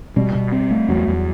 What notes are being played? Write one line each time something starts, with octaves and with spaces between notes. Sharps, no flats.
B2 G3
B2
C4
A3
E2 F#3
E2